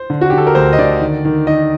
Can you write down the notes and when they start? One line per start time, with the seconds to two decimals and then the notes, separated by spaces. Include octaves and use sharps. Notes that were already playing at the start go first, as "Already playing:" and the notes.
Already playing: C5
0.10 D3
0.21 F#4
0.30 D3 G4
0.38 A4
0.47 A#4
0.55 D2 C5
0.73 D#5
0.78 D3 D5
1.01 D#3
1.25 D#3
1.47 D#3 D#5